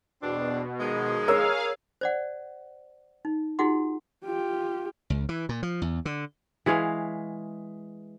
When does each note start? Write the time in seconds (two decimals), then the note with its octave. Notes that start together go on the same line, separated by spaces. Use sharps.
0.22 E2 B2 C4 D4
0.78 D#3 F3 G#3
1.28 G#4 A#4 C#5 F5 E6
2.01 C5 D5 F#5
3.25 D#4
3.59 D#4 F4 F#4 G#4 F#5 C6
4.24 F4 G4
5.10 C#2
5.29 E3
5.49 A#2
5.63 F3
5.82 E2
6.05 D3
6.66 E3 G#3 C#5 F5